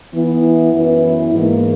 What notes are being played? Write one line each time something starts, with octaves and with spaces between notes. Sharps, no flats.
E3 B3 E4
F#2 E3 B3 E4
G#2 E3 A#3